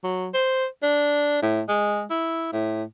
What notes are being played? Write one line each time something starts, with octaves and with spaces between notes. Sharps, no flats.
F#3
C5
D4
A2
G#3
E4
A2